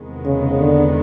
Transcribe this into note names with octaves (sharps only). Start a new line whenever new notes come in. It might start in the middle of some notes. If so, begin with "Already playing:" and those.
Already playing: E2 C3 D#3 G#3 B3
C#3
D3